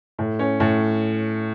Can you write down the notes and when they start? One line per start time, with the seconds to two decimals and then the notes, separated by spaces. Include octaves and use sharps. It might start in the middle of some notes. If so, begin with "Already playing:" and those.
0.19 A2
0.39 C#4
0.60 A2